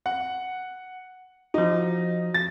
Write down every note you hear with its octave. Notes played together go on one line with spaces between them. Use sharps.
F#5
F3 D#4 F#4
A6